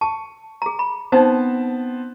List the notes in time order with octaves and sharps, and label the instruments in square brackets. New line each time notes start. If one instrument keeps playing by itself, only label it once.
[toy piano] A5 [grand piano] C#6
[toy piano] G#4 A#5
B5
[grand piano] B3 C4 A5 [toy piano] D#4 C5